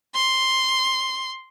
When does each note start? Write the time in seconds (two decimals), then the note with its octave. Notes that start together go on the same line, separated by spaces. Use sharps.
0.15 C6